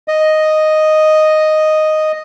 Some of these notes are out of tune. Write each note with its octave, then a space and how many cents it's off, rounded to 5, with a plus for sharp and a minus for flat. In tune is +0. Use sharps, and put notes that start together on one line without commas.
D#5 -5